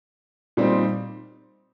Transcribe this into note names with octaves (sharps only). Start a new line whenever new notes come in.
A#2 G3 C4 D#4